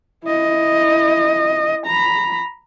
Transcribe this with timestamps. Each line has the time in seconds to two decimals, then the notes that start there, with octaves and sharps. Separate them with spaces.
0.25 E4 D#5
1.86 A#5 B5